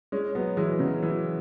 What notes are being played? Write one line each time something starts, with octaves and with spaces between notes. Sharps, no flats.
G#3 C#4
F#3 B3
E3 G#3
C#3 F#3
E3